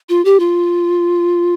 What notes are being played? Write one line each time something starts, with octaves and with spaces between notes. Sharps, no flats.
F4
G4
F4